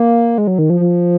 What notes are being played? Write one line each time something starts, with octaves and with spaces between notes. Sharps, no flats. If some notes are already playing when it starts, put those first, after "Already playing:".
Already playing: A#3
G#3
F#3
D#3
F3
F3